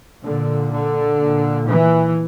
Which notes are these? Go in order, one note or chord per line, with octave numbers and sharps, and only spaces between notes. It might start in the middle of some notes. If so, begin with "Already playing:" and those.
A#2 D3
D3
A#2
E3